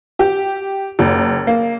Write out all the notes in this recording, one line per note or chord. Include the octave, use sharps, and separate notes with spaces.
G4
F#1
A#3